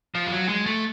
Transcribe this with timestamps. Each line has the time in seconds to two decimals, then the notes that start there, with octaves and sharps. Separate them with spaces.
0.15 F3
0.27 G3
0.32 F#3
0.49 G#3
0.66 A3